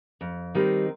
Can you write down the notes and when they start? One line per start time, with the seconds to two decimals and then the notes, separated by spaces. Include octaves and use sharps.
0.21 F2
0.54 D#3 G3 C4 D#4